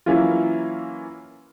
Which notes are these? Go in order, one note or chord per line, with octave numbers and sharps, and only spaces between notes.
E3 F#3 A#3 C#4 E4 F4